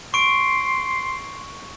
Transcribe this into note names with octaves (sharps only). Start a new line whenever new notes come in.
C6 C#6 D7